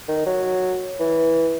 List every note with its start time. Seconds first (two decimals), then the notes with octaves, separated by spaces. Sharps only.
0.08 D#3
0.26 F#3
1.00 E3